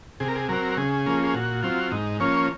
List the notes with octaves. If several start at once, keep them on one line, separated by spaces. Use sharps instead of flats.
C3 G#4
A#4
G#4
F#3 C4 A#4
C#3 G#4
F3 A#3 C#4
G#4
A#2 F#4
F#3 C4 F4
G#2 D#4
F3 A#3 C#4 C#5